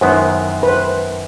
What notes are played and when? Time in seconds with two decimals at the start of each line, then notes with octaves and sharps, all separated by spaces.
0.01 F#2 D#3 G#3 B3 E4 C5
0.63 B4
0.68 C5